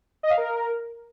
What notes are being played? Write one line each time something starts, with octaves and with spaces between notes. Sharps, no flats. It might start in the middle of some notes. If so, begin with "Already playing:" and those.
D#5
F5
A#4